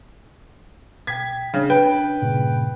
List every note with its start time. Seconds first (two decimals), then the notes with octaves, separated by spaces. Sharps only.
1.07 B2 G5 G#6 B6
1.54 C#3 D4
1.70 B4 G5
2.22 G2 A#2 C#3